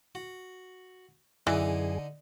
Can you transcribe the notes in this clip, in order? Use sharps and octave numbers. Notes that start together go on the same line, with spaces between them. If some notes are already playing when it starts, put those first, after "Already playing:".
F#4
F#2 D3 E3 D4 D#4 G#4